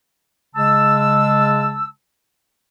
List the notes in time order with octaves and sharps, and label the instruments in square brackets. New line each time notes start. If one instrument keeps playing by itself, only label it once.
[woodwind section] C#3 G#3 A5 E6